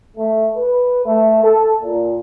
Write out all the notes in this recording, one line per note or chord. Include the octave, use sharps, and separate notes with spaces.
A3
B4
A3
A4
A#2